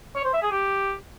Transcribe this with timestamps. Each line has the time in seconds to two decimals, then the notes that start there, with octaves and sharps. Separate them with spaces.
0.15 C#5
0.24 C5
0.33 E5
0.42 G#4
0.51 G4